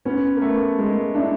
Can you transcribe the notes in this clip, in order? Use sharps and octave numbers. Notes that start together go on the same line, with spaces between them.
B3 C#4
A#3
A3 B3
G#3 A#3
D4 E4